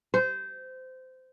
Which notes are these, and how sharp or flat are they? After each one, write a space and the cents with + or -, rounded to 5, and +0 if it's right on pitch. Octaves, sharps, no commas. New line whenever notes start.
C5 -20